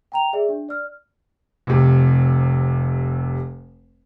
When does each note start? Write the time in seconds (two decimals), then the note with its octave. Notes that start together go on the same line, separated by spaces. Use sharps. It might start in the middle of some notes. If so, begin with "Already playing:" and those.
0.12 G5 A#5 F7
0.33 G#4 D5 E5
0.49 D4
0.69 D5 F6
1.67 F1 C3